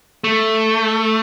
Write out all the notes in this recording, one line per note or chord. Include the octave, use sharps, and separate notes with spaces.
A3